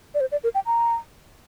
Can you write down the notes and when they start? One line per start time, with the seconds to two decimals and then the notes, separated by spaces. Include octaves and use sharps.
0.14 D5
0.20 C5
0.32 D5
0.44 A#4
0.55 G5
0.66 A#5